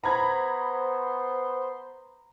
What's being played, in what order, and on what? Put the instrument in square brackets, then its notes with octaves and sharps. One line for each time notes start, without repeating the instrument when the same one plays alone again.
[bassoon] B3 [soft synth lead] C5 [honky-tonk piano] A#5 B5 G#6